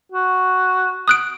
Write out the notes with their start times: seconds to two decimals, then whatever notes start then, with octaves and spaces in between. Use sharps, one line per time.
0.12 F#4
1.08 D#6 F#6 D7